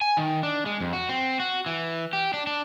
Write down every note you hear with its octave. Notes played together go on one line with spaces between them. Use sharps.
G#5
D#3
D4
G#3
F2
F#4
C4
F#4
E3
G4
D4
D4